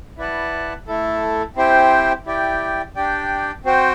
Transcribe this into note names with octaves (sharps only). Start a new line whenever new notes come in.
E4 B4 D5 F#5 A5
A3 E4 A4
C4 E4 G4 C5 G5
E4 G4 D5 G5
D4 G4 D5 G5
C4 F#4 C5 G5